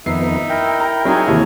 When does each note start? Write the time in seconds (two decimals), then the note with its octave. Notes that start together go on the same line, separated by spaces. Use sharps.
0.06 F2 D#3 B3 D#4 E5 C7
0.50 E4 A#4 G5
0.80 A#5
1.05 F#3 D#4 G#4 C#5 G#5
1.27 D#2 C3 E3